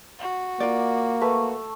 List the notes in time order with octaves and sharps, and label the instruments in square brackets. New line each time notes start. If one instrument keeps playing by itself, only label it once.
[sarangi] F#4
[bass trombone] A#3 [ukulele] F4 D5
[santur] A3 [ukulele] B4